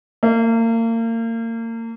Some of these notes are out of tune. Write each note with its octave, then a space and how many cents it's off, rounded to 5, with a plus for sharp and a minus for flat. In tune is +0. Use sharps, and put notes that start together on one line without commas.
A#3 -35